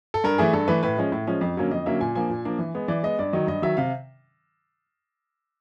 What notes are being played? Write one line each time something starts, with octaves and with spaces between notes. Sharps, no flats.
A4
G2 A#4
E3 A3 G#4
G2 A4
E3 A3 B4
A2 B4
F3 G#3 C#4
A2
F3 G#3 C#4
F2
D3 F#3 A#3 C#4
F2 D#5
D3 F#3 A#3 C#4 E5
A#2 G#5
F3 A#3 D4 G#5
A#2
F3 A#3 D4
E3
G#3 B3
E3 D5
G#3 B3 D#5
G2 D5
D#3 F#3 D#5
G2 D#5
D#3 F#3 E5
C3 F5